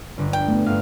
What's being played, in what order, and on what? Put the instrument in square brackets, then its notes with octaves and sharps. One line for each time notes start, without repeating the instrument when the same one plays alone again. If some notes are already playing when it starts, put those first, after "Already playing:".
[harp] G1 D3
[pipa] G5
[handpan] A3 B3
[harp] G1 F5